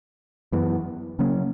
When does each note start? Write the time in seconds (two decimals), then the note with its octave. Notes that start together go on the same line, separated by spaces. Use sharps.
0.52 F#2 E3 B3
1.19 C#3 F#3 A#3 C#4